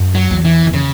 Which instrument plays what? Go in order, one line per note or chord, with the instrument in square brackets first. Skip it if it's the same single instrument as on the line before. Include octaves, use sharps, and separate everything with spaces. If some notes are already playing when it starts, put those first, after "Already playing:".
Already playing: [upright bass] F#2
[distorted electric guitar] F#3
[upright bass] E2
[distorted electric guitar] E3
[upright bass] E2
[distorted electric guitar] C#3